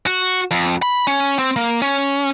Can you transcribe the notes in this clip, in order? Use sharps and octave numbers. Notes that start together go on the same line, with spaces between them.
F#4
F2
B5
C#4
C4
A#3
C#4